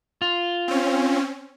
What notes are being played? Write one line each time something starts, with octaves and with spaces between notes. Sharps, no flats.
F4
C4 C#4